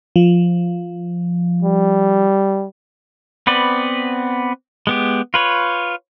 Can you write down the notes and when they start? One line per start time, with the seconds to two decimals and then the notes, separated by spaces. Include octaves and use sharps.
0.16 F3
1.63 G3
3.47 B3 C4 B4 D5
4.87 G#3 B3 G4
5.34 F4 B4 C#5